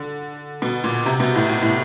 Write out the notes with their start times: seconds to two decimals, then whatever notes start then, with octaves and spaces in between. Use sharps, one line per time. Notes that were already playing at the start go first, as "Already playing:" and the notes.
Already playing: D3
0.62 B2
0.84 A#2
1.06 C3
1.20 B2
1.35 A2
1.49 A2
1.62 A2